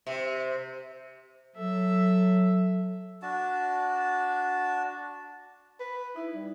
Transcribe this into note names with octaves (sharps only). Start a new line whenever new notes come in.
C3
F#3 A4 E5
D4 F#4 A5
B4
D#4 E4
G3